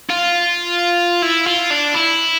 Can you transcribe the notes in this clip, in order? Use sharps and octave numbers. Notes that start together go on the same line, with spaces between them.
F4
E4
F4
D4
E4